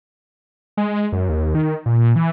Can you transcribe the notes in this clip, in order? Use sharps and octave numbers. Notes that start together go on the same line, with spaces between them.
G#3
F#2
D#2
D#3
A#2
E3